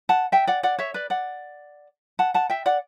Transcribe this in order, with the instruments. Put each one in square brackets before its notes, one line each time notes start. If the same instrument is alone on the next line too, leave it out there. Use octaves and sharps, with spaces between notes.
[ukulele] F#5 A5
E5 G5
D5 F#5
D5 F#5
C#5 E5
B4 D5
D5 F#5
F#5 A5
F#5 A5
E5 G5
D5 F#5